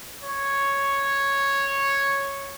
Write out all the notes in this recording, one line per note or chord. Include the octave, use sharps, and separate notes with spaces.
C#5